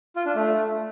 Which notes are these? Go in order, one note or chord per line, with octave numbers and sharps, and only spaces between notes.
F4
D4
A3